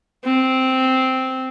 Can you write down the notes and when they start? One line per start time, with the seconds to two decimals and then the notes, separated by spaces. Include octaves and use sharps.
0.24 C4